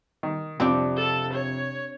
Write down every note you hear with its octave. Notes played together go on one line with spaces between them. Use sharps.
D#3
F2 C3 C4 D4 G4
A4
C#5